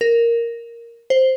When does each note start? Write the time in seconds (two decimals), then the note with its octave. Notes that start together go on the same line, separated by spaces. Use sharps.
0.01 A#4
1.10 C5